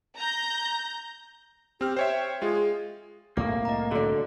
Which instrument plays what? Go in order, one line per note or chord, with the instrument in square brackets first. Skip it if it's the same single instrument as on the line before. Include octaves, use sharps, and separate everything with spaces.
[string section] A#5 G6
[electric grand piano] C4 F6 [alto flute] G4
[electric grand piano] C5 C#5 E5 [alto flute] G5
[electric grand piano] G#3 F4 [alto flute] G#4
[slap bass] C2 A2 A3 [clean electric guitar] A#3 [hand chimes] D6
[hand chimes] D#5 A#5
[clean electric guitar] D3 [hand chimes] F#4 [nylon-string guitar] A4 D5